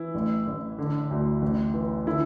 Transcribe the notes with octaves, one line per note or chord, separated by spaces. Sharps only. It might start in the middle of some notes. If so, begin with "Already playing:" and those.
Already playing: E3 E4
A1
A1
D3
D2
A1
E3
D3 E4